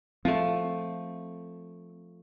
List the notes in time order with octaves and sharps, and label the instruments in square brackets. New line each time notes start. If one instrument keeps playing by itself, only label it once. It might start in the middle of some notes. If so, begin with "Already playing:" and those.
[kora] F3 A3 [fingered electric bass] C4